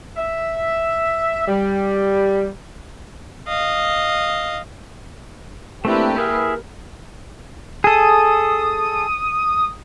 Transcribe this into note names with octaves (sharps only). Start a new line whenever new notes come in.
E5
G3
D#5 F5
A3 A#3 C4 D4 E4 G4 B4
E4 G#4 A#4 E5
G#4 A4 D#6